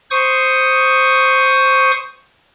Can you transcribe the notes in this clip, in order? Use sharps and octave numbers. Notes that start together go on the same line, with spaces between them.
C5 C#6 D#6